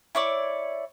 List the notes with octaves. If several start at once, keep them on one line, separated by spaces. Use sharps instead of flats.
E4 C#5 D5